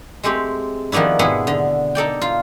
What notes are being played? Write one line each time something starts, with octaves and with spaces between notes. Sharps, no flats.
G#3 A3 C4 G4
D#3 F3 B3 D4 E4
G#2 B2 B3 E4 G#4
D3
D#4 A4 D5 G5
F4